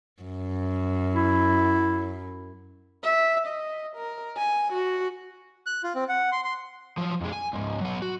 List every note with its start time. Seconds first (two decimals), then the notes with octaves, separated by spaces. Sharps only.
0.23 F#2
1.14 E4
3.03 E5
3.47 D#5
3.96 A#4
4.37 G#5
4.73 F#4
5.66 F#6
5.84 F4
5.95 C4
6.09 F#5
6.32 C6
6.44 C6
6.98 F3 F#3
7.21 F2 G#3
7.33 G#5
7.53 C#2 G#2
7.81 F#3 B3
8.02 F#4